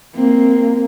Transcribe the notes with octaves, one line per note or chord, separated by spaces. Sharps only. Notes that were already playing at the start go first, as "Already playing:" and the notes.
A#3 C4